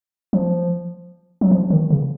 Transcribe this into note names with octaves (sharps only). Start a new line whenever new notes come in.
F3
F#3
F3
D#3
C#3